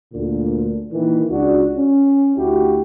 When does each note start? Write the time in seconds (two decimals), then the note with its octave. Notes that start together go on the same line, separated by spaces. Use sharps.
0.13 D2 A#2 D3
0.91 A#2 D#3 E3
1.30 C#2 D4 F#4
1.76 C#4
2.36 D2 E4 F#4 G4